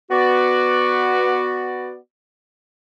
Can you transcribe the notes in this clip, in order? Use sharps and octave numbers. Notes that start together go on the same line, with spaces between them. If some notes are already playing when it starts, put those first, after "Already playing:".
B3 F#4 D5